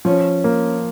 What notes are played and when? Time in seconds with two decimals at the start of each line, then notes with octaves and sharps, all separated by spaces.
0.05 F3 C#4
0.44 A#3